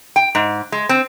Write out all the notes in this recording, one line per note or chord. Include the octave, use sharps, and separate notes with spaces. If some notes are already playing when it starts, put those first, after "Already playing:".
G5
G#2
G#3
C4